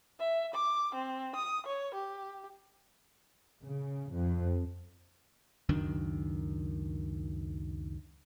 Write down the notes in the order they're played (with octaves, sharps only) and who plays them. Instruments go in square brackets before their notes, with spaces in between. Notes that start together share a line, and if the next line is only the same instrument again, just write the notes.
[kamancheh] E5
D6
C4
D#6
C#5
G4
[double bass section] C#3
F2
[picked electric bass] C#2 F#2 D#3 D4